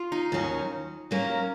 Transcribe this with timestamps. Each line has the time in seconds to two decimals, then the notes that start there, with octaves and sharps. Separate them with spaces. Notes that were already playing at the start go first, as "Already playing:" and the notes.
Already playing: F4
0.12 D#4
0.32 D#2 D#3 F#3 C#4
1.11 F#3 A#3 C#4